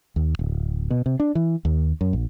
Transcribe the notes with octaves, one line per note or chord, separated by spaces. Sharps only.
D#2
D1
B2
C3
D4
E3
D#2
F#2
A#1